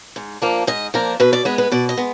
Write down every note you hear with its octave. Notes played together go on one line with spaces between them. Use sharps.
G#2
F3 A#3 D4
G#2 D#5
F3 A#3 D4 A#4
B2 B4
D5
G#3 B3 B4
B4
B2 D5
D#5
G#3 B3